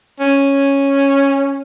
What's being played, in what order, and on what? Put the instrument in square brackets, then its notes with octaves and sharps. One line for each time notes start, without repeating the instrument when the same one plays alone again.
[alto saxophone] C#4